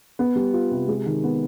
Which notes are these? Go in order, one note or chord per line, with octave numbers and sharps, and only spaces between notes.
B3
G3
F4
C3
G#3
D#3
B3